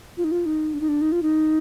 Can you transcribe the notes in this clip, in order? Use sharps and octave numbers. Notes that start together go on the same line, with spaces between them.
F4
D#4
F4
D#4
D4
D#4
D4
D#4
F4
D#4